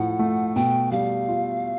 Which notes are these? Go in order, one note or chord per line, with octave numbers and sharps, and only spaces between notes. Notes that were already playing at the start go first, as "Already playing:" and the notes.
Already playing: A2 F3 F#5
A3
B2 G5
G3 F5
F4